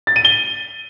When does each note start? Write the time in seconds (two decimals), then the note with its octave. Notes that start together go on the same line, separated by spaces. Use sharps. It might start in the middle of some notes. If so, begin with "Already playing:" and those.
0.07 A6
0.16 D#7
0.25 G7